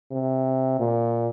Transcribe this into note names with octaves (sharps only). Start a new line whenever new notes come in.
C3
A#2